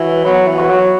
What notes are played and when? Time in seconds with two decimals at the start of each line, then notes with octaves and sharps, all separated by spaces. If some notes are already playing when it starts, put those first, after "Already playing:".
Already playing: E3 F#4 C#5
0.25 F#3 B3
0.47 E3
0.58 F#4 C#5
0.70 F#3